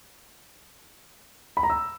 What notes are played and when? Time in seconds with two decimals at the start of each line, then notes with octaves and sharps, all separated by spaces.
1.57 B5
1.63 A#5
1.70 E6